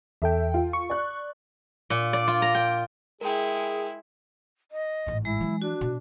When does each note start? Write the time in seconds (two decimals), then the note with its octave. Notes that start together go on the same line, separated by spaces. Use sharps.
0.22 E2 A4 E5 G5
0.54 F4
0.73 C#6
0.90 D5 F#6
1.90 A#2
2.13 D5
2.28 F4
2.42 A#5
2.55 G5
3.21 G#3 E4 G#4 A#4 G5
4.72 D#5
5.06 A1 G#2
5.25 G#3 E4
5.41 E3 F#3
5.62 D4 F#4
5.81 B2